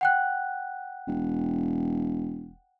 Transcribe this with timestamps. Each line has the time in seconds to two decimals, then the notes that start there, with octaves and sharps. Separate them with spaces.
0.01 F#5 G5 F#6
1.07 E1